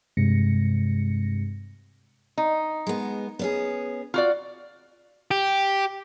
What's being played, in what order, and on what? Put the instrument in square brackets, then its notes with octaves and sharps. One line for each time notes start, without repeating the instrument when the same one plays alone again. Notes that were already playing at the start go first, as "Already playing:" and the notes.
[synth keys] G2 C3 G#3 A#6 C#7
[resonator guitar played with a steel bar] D#4
[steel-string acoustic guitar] G#3 B3
B3 C#4 G#4
[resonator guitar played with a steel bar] F4 F#4 D5
[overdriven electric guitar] G4